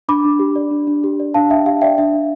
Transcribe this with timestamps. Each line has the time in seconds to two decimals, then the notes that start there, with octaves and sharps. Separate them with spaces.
0.09 D4 B5 D6
0.25 D4
0.39 G4
0.56 D5
0.71 D4
0.87 D4
1.04 G4
1.19 D5
1.34 D4 F5 A5
1.50 D4 E5 G5
1.66 G4 F5
1.81 D5 E5 G5
1.98 D4 E5
2.14 D4